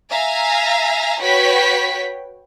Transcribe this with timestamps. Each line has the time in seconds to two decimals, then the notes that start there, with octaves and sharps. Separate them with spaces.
0.11 E5 F5 G#5 A#5
1.20 F#4 B4 C#5 G5 B6